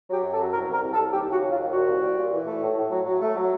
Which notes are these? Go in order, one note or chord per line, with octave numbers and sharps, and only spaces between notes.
F#3 G4
F#2
A4
F#3
C2 A#4
C2 A#4
C2
A4
C2
D#2 G4
C#3
F#4
F#3
F4
D#2
A#2 F#4
C2
G3
A#2
E3
A3
A2
A2
F#3
F#3
A3
F#3